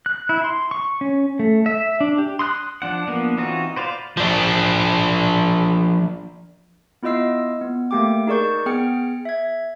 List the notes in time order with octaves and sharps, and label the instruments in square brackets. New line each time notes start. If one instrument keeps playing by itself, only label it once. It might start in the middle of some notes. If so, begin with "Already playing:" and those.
[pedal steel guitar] F#6
E4
C6
C#6
C#4
A3
E5
D4
G4
C6 D#6 F#6
F3 D4 F#5
F3 A#3 B3 D4
E3 C4 D#4 F4 F#4
B4 C5 D5 F5
[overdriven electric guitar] F3 D4
[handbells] B3 E4 F4 D#5 E6 C7
B3
A3 A#3 G4 G5 D6
D#4 G#4 A#4 D5 C#6 G6
B3 G#4 G5 F6 C#7
E5 G#6